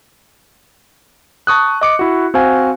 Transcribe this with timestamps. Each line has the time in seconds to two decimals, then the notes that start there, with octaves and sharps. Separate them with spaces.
1.47 A5 C#6 D#6 F#6
1.81 D#5 D6 C#7
1.99 E4 F#4
2.34 C4 F#4 C5 F5 G#5